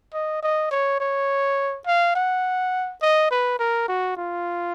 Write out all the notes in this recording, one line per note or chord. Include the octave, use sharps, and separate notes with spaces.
D#5
D#5
C#5
C#5
F5
F#5
D#5
B4
A#4
F#4
F4